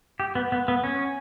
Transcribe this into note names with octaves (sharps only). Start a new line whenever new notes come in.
G4
B3
B3
B3
C#4